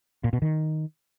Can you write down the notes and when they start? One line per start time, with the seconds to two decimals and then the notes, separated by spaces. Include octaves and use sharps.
0.24 A#2
0.33 B2
0.42 D#3